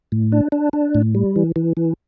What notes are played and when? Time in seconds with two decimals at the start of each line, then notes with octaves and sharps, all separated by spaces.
0.12 A2
0.32 D4
0.52 D4
0.73 D4
0.95 A2
1.15 G3
1.36 E3
1.56 E3
1.77 E3